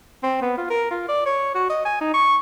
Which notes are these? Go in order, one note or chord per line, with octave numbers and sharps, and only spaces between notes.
C4
B3
F4
A#4
F4
D5
C#5
F#4
D#5
G#5
D#4
C#6